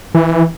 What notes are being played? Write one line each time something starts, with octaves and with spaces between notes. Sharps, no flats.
E3